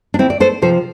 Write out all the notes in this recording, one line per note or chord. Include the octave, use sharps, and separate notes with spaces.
D4
D2 C4 E4
D5
A4 C5
C3 F3 A4 C5